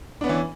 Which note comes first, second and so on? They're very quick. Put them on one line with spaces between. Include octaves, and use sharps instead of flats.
D4 B3 C#4 E3